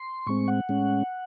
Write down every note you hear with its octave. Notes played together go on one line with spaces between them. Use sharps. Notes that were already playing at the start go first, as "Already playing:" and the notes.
Already playing: C6
A2 G#3 C4 C#6
F#5
A2 G#3 C#4